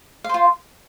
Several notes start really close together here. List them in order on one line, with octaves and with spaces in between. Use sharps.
F5 C5 F4